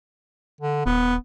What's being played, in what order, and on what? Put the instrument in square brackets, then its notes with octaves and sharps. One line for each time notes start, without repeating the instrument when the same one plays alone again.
[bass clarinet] D3
[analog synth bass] D#1 [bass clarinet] B3